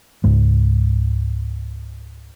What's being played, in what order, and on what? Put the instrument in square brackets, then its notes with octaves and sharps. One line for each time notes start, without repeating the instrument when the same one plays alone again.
[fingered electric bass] C#2 G#2 G#3